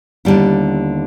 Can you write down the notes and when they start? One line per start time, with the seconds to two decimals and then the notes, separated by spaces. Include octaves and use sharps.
0.25 D#2 D3 G3 B3 E4